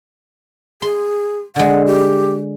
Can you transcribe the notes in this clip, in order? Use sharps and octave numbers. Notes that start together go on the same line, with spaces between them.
G#4 C6
D3 G#3 F#5
G4